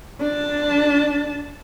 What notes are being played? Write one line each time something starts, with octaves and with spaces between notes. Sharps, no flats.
D4 A5